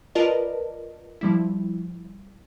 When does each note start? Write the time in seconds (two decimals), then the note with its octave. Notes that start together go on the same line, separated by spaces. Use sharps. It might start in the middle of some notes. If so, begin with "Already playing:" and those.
0.15 F4 A#4 B4 D5 D#5 A5
1.21 F3 G3 E4